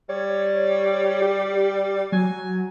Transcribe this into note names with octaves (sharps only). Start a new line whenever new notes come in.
G3 C#5
G4
F#3 G#5